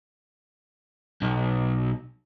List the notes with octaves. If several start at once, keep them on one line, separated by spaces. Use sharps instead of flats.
B1